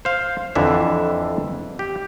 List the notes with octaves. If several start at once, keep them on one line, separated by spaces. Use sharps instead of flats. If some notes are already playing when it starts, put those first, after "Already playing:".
C5 F5
F2 D3 E3 D4 E5
G4